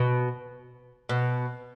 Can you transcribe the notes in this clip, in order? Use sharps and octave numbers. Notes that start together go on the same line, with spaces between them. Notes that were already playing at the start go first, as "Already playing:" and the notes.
Already playing: B2
B2